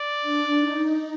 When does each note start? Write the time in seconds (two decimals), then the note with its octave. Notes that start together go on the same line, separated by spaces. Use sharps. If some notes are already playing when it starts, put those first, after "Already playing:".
Already playing: D5
0.22 D4
0.60 D#4